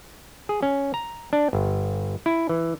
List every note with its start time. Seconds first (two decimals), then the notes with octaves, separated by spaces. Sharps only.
0.49 G#4
0.63 C#4
0.94 A#5
1.33 D4
1.53 G1
2.26 E4
2.49 E3